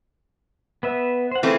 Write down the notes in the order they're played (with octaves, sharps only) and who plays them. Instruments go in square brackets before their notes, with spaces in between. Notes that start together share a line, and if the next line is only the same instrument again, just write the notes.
[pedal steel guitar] B3 B4 E5
C5 F#5
[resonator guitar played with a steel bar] E3 A3 C4 [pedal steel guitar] F4 G#4